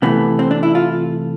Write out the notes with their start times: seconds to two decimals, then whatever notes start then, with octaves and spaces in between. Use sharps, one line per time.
0.02 C3 E3 A3 B3
0.39 C4
0.51 D4
0.63 E4
0.75 F4